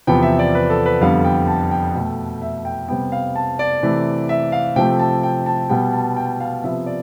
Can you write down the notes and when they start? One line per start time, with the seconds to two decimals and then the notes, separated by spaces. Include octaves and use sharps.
0.07 E2 C3 F3 B3 G5
0.22 E5
0.39 D5
0.55 B4
0.70 A4
0.86 B4
1.01 F2 D3 G3 B3 F5
1.25 G5
1.48 A5
1.71 G5
1.95 B2 A3
2.42 E5
2.65 G5
2.88 C3 G3 B3 G5
3.12 F5
3.36 A5
3.59 D5
3.83 C3 E3 A3
4.29 E5
4.52 F5
4.76 C3 F3 A3 G5
4.99 A5
5.23 G5
5.46 A5
5.69 B2 G3 B3 G5
5.93 A5
6.17 G5
6.40 F5
6.64 C3 F3 B3 E5
6.86 D5